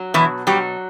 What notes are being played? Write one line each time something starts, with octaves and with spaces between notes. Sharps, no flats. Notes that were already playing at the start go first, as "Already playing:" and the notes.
Already playing: F#3
B2 E3 E4
F#3 G3 G4